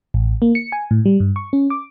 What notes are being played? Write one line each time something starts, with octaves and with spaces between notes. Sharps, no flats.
A1
A#3
C#7
G#5
A2
G3
G2
C#6
C#4
D6